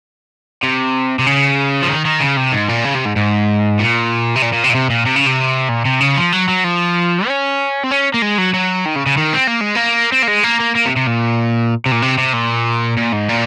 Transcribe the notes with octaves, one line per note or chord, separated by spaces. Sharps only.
C3
C3
C#3
F3
D#3
D#3
C#3
C3
G#2
A#2
C#3
C3
G#2
G#2
A#2
C3
A#2
A#2
C3
A#2
C3
A#2
C3
C#3
C3
A#2
C3
C#3
F3
F#3
F#3
F3
C#4
C4
C#4
A#3
G#3
F#3
F#3
D#3
C#3
C#3
D#3
C4
A#3
G#3
A#3
C4
A#3
G#3
A#3
A#3
A#3
C3
C3
A#2
C3
A#2
C3
C3
A#2
A#2
G#2
A#2